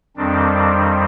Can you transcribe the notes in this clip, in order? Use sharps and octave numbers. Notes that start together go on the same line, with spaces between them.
F2 D#3 G3 C4 D4